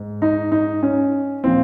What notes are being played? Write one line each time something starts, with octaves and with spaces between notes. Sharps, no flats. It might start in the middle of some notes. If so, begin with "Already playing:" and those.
Already playing: G#2
D#4
D#4
C#4
A#2 F3 C4